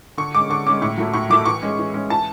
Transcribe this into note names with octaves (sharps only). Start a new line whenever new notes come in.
D3 C#6
G#3 C#4 D6
D3 C#6
G#3 C#4 D6
A2 C#6
F#3 A3 E4
A2 C#6
F#3 A3 E4 D6
E3 C#6
G#3 C#4
E3
G#3 C#4
E3 A5